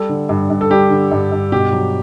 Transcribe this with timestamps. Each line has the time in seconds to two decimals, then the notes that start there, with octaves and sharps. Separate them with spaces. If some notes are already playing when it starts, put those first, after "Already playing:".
Already playing: G3 A4
0.09 D3
0.29 G2
0.50 G2
0.61 A4
0.70 G3 G4
0.90 D3
1.11 G2
1.32 G2
1.52 B2 G4
1.73 F#3